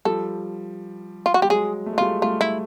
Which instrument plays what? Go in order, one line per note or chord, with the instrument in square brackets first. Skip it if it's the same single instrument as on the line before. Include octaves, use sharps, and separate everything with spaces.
[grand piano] F3 G3 [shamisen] A4
[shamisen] F4
F#4
[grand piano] G3 [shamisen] G4
[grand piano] F#3 G#3 [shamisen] G#4
[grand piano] A3
G#3
[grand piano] G3 A3 [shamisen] F4
[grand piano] G3 A3 [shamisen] F4
[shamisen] E4